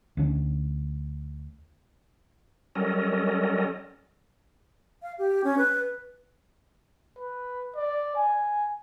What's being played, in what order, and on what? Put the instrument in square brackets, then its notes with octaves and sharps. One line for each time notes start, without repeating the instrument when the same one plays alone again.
[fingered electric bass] D2 D3 C#4
[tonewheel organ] F#3 G3 C#4 A4 A#4 D#5
[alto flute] F5
G4
C#4
B4
[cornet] B4
D5
G#5